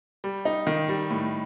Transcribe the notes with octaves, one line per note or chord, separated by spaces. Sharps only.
G3
D#4
D#3
G3
A2